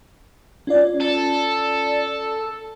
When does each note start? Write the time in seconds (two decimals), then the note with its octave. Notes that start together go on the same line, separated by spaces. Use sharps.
0.67 C#4 F4 D5
1.00 A4